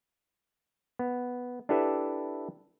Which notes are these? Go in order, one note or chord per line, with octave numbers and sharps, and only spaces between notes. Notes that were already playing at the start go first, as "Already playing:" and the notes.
B3
D4 E4 G4 A4 B4 E5